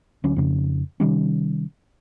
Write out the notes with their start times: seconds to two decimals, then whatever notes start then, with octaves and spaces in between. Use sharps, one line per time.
0.24 D2 F#3 C#4
0.36 F2 C#3
1.00 C3 D#3 G3 C#4